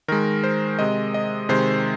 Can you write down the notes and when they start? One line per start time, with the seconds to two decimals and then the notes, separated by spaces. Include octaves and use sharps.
0.08 D#3 G#3 A#4
0.44 C5
0.79 C3 G#3 D#5
1.14 D#5
1.49 C3 D#3 G#3 C5